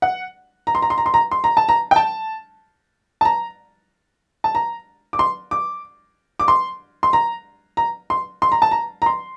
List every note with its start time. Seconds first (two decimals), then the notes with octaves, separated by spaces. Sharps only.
0.02 F#5
0.67 A#5
0.75 C6
0.82 A#5
0.90 C6
0.98 A#5
1.06 C6
1.14 A#5
1.31 C6
1.44 A#5
1.57 A5
1.69 A#5
1.91 G5
1.96 A5
3.21 A5
3.25 A#5
4.44 A5
4.55 A#5
5.13 D6
5.19 C6
5.51 D6
6.40 D6
6.48 C6
7.03 C6
7.13 A#5
7.77 A#5
8.10 C6
8.42 C6
8.52 A#5
8.62 A5
8.71 A#5
9.02 A#5
9.06 C6